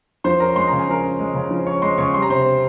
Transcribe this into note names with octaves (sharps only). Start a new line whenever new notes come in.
F3 C5 C6
C#4 A#4 A#5
G#3 C6
C#3 A#5
G#5
F3 A#4 A#5
C#4
G#3
C#3
F3
C#4 C#5 C#6
G#3 C5 C6
C#3 C#5 C#6
G3 C6
A#5
C3 C5 C6
C4